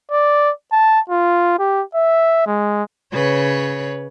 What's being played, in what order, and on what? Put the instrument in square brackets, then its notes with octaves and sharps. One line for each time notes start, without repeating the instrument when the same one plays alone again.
[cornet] D5
A5
F4
G4
E5
G#3
[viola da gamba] C#3 B4 C#5